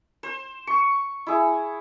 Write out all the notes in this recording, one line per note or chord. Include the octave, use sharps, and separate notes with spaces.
C5
C#6
E4 G#4